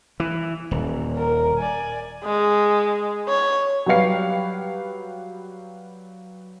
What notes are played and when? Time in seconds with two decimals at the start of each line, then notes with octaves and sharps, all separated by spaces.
0.20 E3
0.71 D#1
1.17 A#4
1.59 D5 G#5
2.24 G#3
3.28 C#5
3.86 F#3 G3 G4 B4 F5 C7